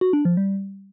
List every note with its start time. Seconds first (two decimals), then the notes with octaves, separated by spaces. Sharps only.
0.01 F#4
0.13 D4
0.25 F3
0.37 G3